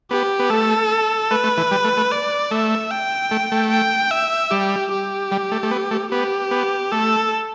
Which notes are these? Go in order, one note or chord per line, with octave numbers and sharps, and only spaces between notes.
B3 G4
B3
A3 A4
A3 B4
A3
E3
G3
A3
A3
D5
A3 E5
G5
A3
A3
G5
E5
G3 G4
G4
G3
A3
A3
B3
A3
B3 G4
B3
A3 A4